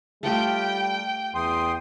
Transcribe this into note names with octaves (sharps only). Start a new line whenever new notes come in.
G3 A3 F4 G4 G5
E2 G5 C6 D#6